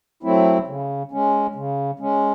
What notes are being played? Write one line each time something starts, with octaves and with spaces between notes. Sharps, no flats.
F#3 A3 C4 E4
C#3
G#3 C#4
C#3
G#3 C#4